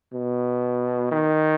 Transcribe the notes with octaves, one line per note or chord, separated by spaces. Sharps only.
B2
D#3